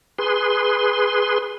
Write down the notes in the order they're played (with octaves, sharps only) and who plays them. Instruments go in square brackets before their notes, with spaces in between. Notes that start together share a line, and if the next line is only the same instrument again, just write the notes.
[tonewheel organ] G#4 B4 C6